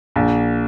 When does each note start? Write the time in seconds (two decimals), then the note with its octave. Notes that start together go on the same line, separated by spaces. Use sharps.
0.16 A#1